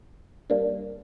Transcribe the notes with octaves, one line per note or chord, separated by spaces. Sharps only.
G3 A#3 D4